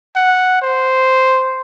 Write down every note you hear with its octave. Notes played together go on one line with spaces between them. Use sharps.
F#5
C5